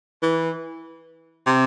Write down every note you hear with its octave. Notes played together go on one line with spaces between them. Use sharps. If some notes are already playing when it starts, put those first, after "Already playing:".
E3
C3